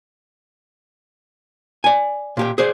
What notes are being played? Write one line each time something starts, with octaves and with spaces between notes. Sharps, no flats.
D5 G#5
A#2 G4 G5
G#4 C5 D5